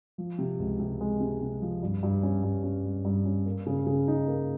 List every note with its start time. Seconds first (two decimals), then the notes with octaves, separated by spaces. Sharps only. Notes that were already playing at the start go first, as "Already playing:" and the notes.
0.18 F3
0.39 C3
0.59 C#2
0.79 C3
1.01 G#3
1.21 C3
1.41 C3
1.62 F3
1.83 G2
2.03 G2
2.23 C#4
2.43 G2
2.64 C#4
2.85 G3
3.05 G2
3.25 C#4
3.46 A#3
3.66 C#3
3.87 C#3
4.08 D#4
4.28 A#3